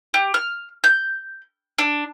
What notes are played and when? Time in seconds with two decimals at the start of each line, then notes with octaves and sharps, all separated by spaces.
0.14 G4
0.34 F6
0.84 G6
1.78 D4